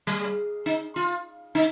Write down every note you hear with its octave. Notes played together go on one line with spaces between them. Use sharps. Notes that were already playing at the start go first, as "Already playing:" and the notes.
G3
D#4
F4
D#4